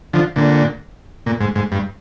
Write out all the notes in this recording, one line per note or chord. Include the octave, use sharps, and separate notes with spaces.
D3 F3
A#2 D3
A#2
G#2
G#2
G2